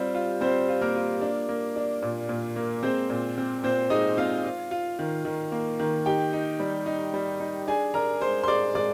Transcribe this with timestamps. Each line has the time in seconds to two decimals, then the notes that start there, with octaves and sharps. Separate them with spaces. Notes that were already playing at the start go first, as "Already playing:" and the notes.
Already playing: G3 C4 F4 C5
0.15 F4
0.41 G3 C4 C5
0.69 F4
0.81 A#3 A#4
0.96 F4
1.22 D4
1.49 A#3
1.76 D4
2.03 A#2
2.29 A#2
2.56 A#3
2.83 G#3 C4 C5
3.10 A#2
3.38 C4
3.63 A#2 C4 C5
3.90 G#3 D#4 D#5
4.17 C4 F4 F5
4.45 F4
4.71 F4
4.99 D#3
5.25 D#3
5.52 A#3
5.80 D#3
6.06 D#4 G4 G5
6.33 D#4
6.60 G3
6.86 D#4
7.14 G3
7.40 D#4
7.67 D4 G#4 G#5
7.94 D4 A#4 A#5
8.21 G#3 C5 C6
8.43 C6
8.48 G#3 D5 D6
8.75 G#3 D5 D6